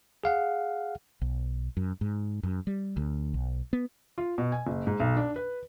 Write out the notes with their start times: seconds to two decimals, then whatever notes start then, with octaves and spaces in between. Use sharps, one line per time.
0.24 G#4 F5 F#5
1.21 B1
1.77 F#2
2.01 G#2
2.43 F#2
2.67 G3
2.97 D2
3.34 B1
3.73 B3
4.18 F4
4.38 B2
4.52 G#5
4.67 F#1
4.87 G#2
5.00 B1
5.17 D4
5.36 B4